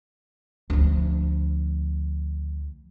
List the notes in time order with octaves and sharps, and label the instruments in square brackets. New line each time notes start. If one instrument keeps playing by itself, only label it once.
[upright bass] D2 F3